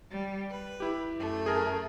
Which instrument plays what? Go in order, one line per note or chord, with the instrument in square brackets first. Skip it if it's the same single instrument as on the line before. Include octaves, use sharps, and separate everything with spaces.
[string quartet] G3
B4
[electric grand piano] E4 G4
[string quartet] F#2 A3
[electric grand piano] G#4 A#4